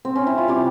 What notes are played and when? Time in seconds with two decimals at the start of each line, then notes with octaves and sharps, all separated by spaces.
0.05 C4
0.15 C#4
0.27 E4
0.38 F4
0.48 C3 G3 G4